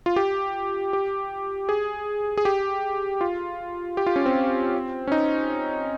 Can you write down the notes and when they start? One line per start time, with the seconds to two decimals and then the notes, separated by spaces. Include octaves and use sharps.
0.06 F4
0.16 G4
0.93 G4
1.69 G#4
2.37 G#4
2.45 G4
3.21 F4
3.97 G4
4.07 F4
4.16 C#4
4.26 C4
5.07 C#4
5.12 D#4